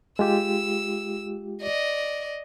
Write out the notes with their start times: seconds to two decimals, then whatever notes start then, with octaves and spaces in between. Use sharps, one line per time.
0.19 G#3 F4 G4 E6
1.62 D5 D#5